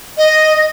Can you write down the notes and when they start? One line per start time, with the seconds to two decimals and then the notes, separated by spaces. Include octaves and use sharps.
0.18 D#5